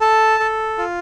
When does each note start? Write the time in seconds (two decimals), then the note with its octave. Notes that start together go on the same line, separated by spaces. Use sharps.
0.01 A4 A5
0.40 A4
0.78 F4